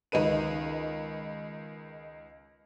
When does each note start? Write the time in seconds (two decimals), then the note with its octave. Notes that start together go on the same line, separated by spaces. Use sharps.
0.12 C#2 D#3 D#4 B4 D#7